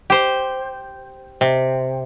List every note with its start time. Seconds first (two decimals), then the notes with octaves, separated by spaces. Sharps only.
0.10 G4 C5
1.41 C3